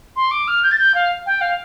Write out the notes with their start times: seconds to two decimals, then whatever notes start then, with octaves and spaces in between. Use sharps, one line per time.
0.16 C6
0.31 D6
0.48 F6
0.63 G6
0.71 A6
0.79 G6
0.95 F5
1.26 G5
1.41 F5